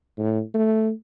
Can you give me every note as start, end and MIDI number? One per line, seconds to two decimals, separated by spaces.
0.18 0.41 45
0.54 0.92 57